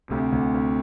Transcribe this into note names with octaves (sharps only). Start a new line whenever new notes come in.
D2 C3
D2
D2